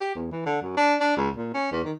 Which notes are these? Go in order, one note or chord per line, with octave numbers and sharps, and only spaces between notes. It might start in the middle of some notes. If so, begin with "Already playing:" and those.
G4
E2
E3
D3
F#2
D4
D4
C#2
A#2
C#4
E2
D#3